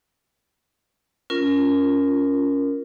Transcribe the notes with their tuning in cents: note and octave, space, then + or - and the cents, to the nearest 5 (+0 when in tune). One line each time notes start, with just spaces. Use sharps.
C#4 +15 F4 +0 A#4 +0